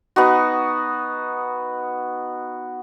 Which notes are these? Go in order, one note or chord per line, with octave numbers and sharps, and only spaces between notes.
B3 D#4 F#4